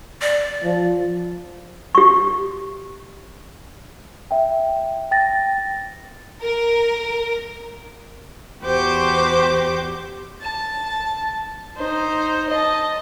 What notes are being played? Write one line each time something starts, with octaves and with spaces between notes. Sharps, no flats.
D5
F3
G4 C#6
E5 G5
G5 A6 A#6
A#4
E2 F#4 G4 C5 D6 G6
A5
D#4 C5
D#5 A5